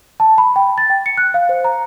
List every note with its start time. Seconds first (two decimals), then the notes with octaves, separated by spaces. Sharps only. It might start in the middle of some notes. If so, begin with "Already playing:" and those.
0.20 A5
0.38 B5
0.56 G5
0.78 A6
0.90 G5
1.06 C#7
1.18 F#6
1.34 F5
1.49 C5
1.64 A#5